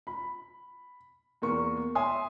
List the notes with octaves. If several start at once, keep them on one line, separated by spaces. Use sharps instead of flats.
B5
E2 A#3 C#6
C#5 E5 G#5 C6 D#6